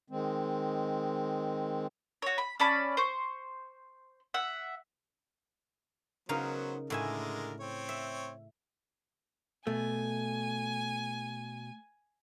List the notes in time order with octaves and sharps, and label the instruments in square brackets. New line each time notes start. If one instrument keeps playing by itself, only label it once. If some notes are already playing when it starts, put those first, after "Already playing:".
[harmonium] D#3 G#3 C4
[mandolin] F#4 C#5
B5
C#4 D5 A5 B5
C5 C#6
E5 F#5
[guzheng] C#3 D#4 A#4 [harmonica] F#3 B3 C5
[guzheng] A2 E5 G#5 [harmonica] D3 G#3 A#4
[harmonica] C4 C#5
[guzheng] E5
[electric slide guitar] B2 [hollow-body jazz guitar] A3 [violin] G#5